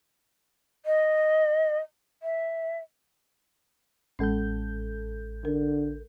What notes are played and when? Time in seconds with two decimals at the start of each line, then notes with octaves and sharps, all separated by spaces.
0.85 D#5
2.23 E5
4.19 A1 G#3 C#4 A4 G6
5.45 D3 A#4